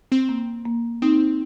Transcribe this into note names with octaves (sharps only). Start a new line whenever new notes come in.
C4
A#3
A#3
C4 D#4